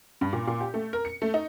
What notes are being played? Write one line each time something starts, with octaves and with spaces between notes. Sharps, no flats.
G2
A#2
A#2
G4
A3
A#4
C#7
A3
D#4